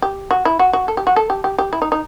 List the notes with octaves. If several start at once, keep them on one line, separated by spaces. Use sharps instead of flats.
G4
F#4
E4
F#4
F#4
A4
G4
F#4
A4
G4
G4
G4
E4
D#4
D#4